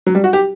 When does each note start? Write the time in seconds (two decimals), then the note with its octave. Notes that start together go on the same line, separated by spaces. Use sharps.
0.06 F#3
0.15 G3
0.24 F#4
0.33 G4